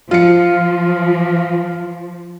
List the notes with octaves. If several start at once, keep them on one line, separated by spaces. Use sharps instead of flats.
F3 F4 C#7